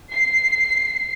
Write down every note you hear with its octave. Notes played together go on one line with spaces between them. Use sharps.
C7